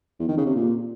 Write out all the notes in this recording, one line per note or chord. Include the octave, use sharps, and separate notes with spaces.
E2
D#3
C#3
C3
A#2